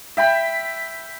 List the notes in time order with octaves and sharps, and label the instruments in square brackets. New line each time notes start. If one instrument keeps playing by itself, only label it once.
[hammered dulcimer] E5 G5 B5